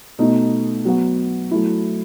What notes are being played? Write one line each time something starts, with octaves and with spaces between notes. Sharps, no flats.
B2 A3 D#4
F#3 B3 F#4
F#3 A3 E4